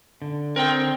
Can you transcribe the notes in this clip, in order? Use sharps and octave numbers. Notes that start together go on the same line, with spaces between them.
D3
C4 A#4 G5